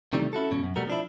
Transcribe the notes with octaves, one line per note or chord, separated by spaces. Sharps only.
C3 D#3 E3 G3 A3
C#4 E4 F#4 A4
E2 G2 B2 C#4
F#2
B2 G3 A3 B3 F#4 A#4
F3 D4 E4